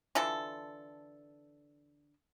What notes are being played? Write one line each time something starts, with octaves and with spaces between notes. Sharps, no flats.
D3 E3 F4 A4